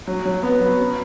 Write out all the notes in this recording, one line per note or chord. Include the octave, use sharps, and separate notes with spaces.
F#3
F#3
B3
F#3
C#4